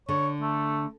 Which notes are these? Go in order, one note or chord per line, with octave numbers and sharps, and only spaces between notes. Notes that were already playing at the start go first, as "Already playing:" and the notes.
D3 C#5
A3